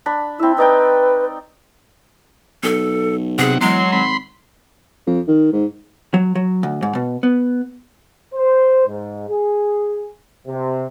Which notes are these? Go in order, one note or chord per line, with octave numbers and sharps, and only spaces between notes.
D4 B5
C4 E4 E5
D#4 B4 D5 G5
B1 A4
C3 G#4 F#5
E2 F#3 G#3 C6
G#1 B5 C6
F2
D#3
G#2
F#3
F#3
D2
G#2
B2
B3
C5
G#2
G#4
C3